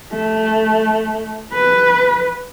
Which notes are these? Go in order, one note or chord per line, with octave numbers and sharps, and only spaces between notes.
A3
B4